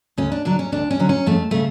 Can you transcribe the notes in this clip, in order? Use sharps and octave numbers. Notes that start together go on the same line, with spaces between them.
D2 C#4
D4
D3 F#3 D4
C#4
D2 D4
C#4
D3 F#3
C#4
F2 A3
C#3 A3